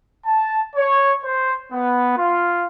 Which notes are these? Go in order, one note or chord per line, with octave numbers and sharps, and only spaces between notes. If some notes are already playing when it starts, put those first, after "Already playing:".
A5
C#5
C5
B3
F4